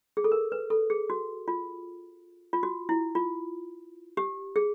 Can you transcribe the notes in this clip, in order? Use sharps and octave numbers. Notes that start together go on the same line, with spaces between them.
G#4
A4
A#4
B4
A4
G#4
F#4
F4
F4
F#4
E4
F4
G4
G#4